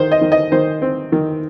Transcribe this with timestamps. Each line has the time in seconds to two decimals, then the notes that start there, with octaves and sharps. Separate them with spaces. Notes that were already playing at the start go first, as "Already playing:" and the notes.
Already playing: D#3 C5
0.12 D#5
0.21 D#3
0.32 D#5
0.52 D#3 C5
0.82 C4
1.12 D#3